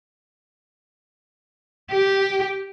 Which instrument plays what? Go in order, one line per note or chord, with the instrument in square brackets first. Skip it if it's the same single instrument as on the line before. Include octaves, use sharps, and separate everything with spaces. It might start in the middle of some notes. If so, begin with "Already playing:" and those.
[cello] G4